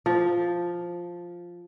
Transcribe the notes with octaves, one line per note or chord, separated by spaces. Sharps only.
F3